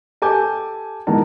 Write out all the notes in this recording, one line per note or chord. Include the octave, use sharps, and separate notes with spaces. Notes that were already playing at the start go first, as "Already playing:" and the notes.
G4 A4 G#5 A5 D6 G6
G#2 D#3 E3 B3 A#4 A5